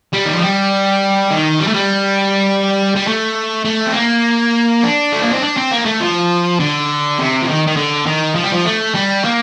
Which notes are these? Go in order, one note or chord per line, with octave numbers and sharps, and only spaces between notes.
G3
D#3
F3
G3
D#3
G3
A3
G3
G3
A3
A3
C4
A#3
D4
A3
A#3
C4
D4
C4
A#3
A3
F3
D3
C3
F3
D#3
D#3
D3
D#3
F3
G3
F3
A3
G3
A#3